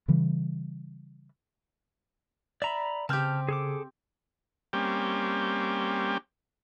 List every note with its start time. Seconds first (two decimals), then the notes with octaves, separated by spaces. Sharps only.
0.08 C#3 E3 G3
2.62 D5 E5 A#5 B5
3.09 C#3 C4 G4 A5 F6 G6
3.49 G#4 A4 D6
4.73 G3 A#3 C4 C#4 G4